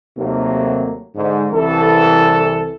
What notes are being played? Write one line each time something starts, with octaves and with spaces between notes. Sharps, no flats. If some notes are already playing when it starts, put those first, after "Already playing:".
D#2 C3 D#3 F#3 A3 A#3
G#2 D3
C2 E3 A4